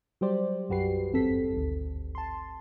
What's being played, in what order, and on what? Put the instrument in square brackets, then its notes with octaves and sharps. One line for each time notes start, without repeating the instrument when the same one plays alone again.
[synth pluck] F#3 G3 G4 C5 D5
B1 F#2 F#4 G4 B4 C7
G#1 E2 G2 C4 A4 B6
G#1 D2
A5 C6